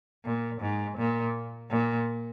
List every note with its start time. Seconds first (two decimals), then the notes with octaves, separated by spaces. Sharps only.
0.25 A#2
0.61 G#2
0.97 A#2
1.70 A#2